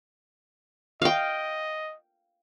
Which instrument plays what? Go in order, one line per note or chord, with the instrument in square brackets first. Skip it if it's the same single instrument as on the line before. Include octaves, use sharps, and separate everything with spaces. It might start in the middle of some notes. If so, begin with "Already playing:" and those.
[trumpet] D#5 [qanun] F5 G5